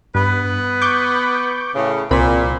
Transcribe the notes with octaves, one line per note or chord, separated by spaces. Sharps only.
G2 B3 B4
C#6 D6 G6
A2 C#3
C2 A#2 C4 B5